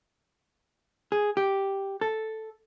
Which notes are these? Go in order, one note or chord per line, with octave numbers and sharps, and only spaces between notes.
G#4
G4
A4